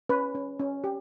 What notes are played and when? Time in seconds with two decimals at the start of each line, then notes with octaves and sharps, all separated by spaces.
0.09 C#4 B4
0.35 C#4
0.59 C#4
0.84 G4